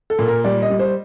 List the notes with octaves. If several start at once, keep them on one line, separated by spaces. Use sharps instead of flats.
A4
A#2
A#4
G3 D5
D#5
G3
C5